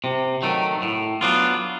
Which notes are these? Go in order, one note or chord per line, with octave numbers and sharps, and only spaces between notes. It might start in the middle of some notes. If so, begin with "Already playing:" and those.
C3
D#3 F#3 A3
A2
F#3 B3 D4 F4